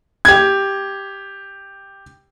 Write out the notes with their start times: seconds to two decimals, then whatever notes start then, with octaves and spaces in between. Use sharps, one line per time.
0.25 G4 G#6